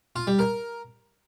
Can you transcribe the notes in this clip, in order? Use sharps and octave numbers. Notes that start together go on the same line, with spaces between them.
F4
G3
A#4